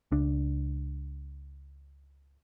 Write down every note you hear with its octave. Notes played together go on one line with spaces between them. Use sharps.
C#2 D4